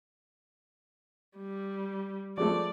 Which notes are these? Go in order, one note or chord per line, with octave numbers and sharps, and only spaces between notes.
G3
F3 G#3 A3 D5